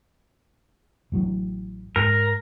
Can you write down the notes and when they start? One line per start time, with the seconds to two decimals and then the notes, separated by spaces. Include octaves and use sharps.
1.12 A1 A2 F#3
1.96 G#2 A#4